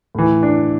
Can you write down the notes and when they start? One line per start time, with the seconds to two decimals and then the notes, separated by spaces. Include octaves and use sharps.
0.15 A2 E3
0.43 D4